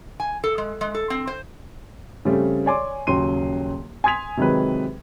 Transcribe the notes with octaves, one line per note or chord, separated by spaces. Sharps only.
G#5
A4
G#3
G#3
A4
C4
C5
C#3 G3 A3 C4
C#5 D5 G#5 C6 D6
D#1 C#3 F#3 G5 C6 D#7
G#5 C6 D#6 G#6 B6 F7
C3 D#3 F#3 G#3 B4